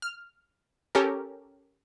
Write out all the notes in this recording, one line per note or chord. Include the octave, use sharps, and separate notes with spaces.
F6
C#4 G4 A4 A#4